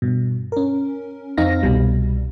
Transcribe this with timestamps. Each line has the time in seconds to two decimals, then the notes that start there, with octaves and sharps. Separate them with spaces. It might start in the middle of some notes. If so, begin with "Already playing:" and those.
0.02 G2 B2
0.52 C#4 A#4
1.37 F2 C4 D#4 F5 A#6
1.63 C2 B2 G3